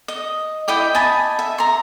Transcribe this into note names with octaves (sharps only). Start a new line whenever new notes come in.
D#5
E4 D#5 G5 D6
D#5 G#5 A5 B5
E5
A#5 C6